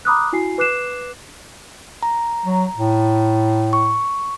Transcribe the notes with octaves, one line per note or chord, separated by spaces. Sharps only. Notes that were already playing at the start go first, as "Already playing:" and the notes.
A#5 B5 D6 D#6 F6 F#6
E4 F#4 G#5 C7
B4 D6 F#6 C7 E7
A#5
F#3
A2
C#6